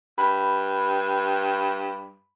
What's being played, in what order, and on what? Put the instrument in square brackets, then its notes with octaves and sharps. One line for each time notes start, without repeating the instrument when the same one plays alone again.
[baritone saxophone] G2 [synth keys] B5